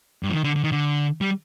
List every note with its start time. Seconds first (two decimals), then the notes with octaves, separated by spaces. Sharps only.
0.23 G2
0.29 F3
0.34 D#3
0.44 D3
0.56 D3
0.64 D#3
0.72 D3
1.21 G3